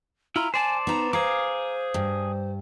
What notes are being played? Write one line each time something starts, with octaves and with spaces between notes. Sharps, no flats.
E4 F4 A#5
C5 D5 G#5 A5
B3 D#4 A#5
G#4 C5 F5 A#5 D6
G2